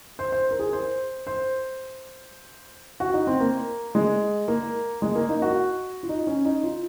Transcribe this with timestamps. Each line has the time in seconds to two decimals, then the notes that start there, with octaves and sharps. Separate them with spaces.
0.19 C5
0.32 C5
0.51 A#4
0.59 G#4
0.73 C5
1.27 C5
3.00 F#4
3.14 D#4
3.27 C4
3.40 A#3
3.95 G#3
4.48 A#3
5.02 G#3
5.15 A#3
5.29 D#4
5.42 F#4
6.03 F4
6.09 D#4
6.27 C#4
6.45 D#4
6.63 F4